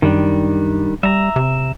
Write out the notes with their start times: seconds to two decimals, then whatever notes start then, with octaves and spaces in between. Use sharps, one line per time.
0.02 F#2 D#3 G3 D4
1.03 G3 E5 A#5
1.36 C3